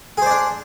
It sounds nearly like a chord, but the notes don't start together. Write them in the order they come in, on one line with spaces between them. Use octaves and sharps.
G#4 C5 D5 D4